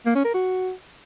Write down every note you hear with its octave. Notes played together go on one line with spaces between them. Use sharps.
A#3
C#4
A#4
F#4